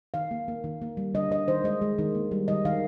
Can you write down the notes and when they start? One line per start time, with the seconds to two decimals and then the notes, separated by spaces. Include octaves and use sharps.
0.14 D#3 F5
0.31 A#3
0.48 A#3
0.64 D#3
0.82 A#3
0.97 G3
1.14 D3 D#5
1.31 D3 D#5
1.48 D#3 C5
1.64 G#3 D#5
1.82 G#3
1.98 D#3
2.15 A#3
2.31 G3
2.48 D#3 D#5
2.65 D#3 F5